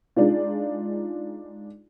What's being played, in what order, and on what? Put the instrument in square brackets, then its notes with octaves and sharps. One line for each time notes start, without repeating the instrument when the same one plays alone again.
[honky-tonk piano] G#3 D4 D#4 F4